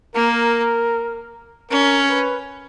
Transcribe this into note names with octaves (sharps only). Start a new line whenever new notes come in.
A#3 A#4
C#4 A#4
B4